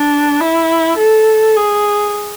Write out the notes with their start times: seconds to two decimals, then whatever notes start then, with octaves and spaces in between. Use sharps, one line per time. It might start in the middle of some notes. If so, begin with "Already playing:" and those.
Already playing: D4
0.40 E4
0.98 A4
1.56 G#4